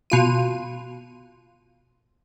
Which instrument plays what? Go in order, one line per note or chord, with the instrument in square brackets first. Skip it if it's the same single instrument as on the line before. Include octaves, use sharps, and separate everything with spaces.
[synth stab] B2 F4 D#7